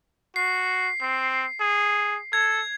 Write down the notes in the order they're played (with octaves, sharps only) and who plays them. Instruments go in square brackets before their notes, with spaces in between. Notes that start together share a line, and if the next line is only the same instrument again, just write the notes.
[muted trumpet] F#4 [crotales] C7
[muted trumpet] C4
G#4
[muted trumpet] A4 [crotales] G#6